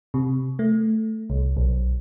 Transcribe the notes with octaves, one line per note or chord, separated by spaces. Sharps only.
C3
A3
C2
B1